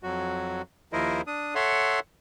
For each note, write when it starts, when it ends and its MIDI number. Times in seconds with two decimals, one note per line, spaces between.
0.03 0.62 41
0.03 0.62 54
0.03 0.62 66
0.93 1.21 39
0.93 1.21 53
0.93 1.21 64
0.93 1.21 70
0.93 1.21 72
0.93 1.21 75
1.27 1.54 62
1.27 1.54 87
1.55 2.00 69
1.55 2.00 73
1.55 2.00 76
1.55 2.00 78
1.55 2.00 84